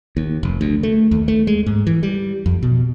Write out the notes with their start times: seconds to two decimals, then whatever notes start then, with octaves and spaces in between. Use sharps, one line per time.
0.17 D#2
0.43 F1
0.61 D2
0.83 A3
1.11 D#2
1.28 A3
1.47 G#3
1.66 G#2
1.87 E3
2.03 G3
2.46 F2
2.63 B2